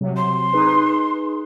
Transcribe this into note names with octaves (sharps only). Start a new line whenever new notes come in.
C3 F#3
C6
D#4 G#4 B4